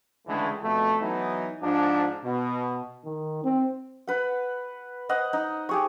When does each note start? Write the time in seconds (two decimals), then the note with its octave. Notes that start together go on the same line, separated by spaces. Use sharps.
0.27 C#2 D3 E3 G#3 A3
0.63 F2 B2 A3
1.01 E3 F#3 B3 D#4
1.62 G#2 F3 D4
2.24 B2
3.05 D#3
3.44 C4
4.07 B4 F#5
5.09 C5 D#5 F#5
5.33 D#4
5.69 G4 G#4 C#6